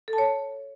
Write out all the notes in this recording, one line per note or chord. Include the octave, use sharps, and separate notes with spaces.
A4
A5
C#5